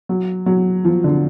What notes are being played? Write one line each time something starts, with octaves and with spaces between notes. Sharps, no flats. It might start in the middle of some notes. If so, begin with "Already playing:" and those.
F#3
F#3
F3
D3